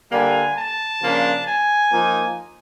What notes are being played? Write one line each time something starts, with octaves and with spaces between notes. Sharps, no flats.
D3 G3 A#3 D4 G#5
A5
C#3 F3 A#3 D4
G#5
F3 A#3 D#4